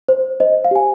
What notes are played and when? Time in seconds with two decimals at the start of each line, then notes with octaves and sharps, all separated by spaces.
0.09 C5
0.40 C5 D#5
0.65 F5
0.71 G4 G#5